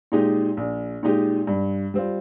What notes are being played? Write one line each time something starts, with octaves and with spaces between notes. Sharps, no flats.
A#2 G#3 D#4 G4
A#1
A#2 G#3 D#4 G4
G2
G3 C4 F4